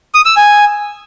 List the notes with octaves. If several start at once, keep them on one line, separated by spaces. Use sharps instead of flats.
D#6
E6
G#5